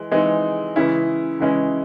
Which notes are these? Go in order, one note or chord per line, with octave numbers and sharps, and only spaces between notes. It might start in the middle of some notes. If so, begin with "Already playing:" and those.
Already playing: E3 G#3
E3 G#3 C4 D#4
C#3 E3 G#3 C#4 E4
C#3 E3 G#3 C#4 E4